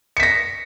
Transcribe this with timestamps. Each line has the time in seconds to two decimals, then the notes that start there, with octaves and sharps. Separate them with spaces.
0.17 C#7
0.20 B6
0.23 A#6